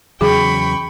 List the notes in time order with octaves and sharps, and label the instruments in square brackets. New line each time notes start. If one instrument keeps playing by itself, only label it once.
[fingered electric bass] E2 C#3 F#3 [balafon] G#4 [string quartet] G5 B5 C#6